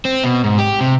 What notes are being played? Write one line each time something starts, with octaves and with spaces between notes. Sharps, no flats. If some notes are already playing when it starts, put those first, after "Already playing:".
C4
B2
G#2
G4
C3